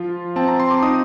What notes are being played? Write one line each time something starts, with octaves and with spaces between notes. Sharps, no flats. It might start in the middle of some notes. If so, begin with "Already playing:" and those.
Already playing: F3 F4
C4 A5
A#5
C6
D6
D#4 D#6